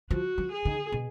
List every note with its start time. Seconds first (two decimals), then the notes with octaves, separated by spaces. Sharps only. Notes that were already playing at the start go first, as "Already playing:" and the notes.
0.10 F3 F#4
0.38 F3
0.52 G#4
0.65 D#3
0.92 B2